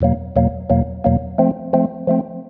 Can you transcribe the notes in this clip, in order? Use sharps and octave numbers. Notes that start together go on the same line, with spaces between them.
E2 B2 F#3 A#3
E2 B2 F#3 A#3
E2 B2 F#3 A#3
E2 B2 F#3 A#3
F3 A3 C4
F3 A3 C4
F3 A3 C4